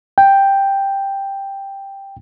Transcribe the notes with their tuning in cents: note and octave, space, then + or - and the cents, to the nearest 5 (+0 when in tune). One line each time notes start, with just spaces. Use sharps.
G5 +5